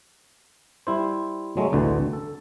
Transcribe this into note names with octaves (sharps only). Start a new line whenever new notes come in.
G3 E4 C5
F#3 G#3 A3
A1 D2 D3 E3
A4